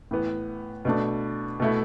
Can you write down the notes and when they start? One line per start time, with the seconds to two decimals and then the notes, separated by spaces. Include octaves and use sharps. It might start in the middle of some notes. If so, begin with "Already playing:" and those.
0.11 A2 E3 B3
0.85 B2 A3 D4
1.60 B2 A3 E4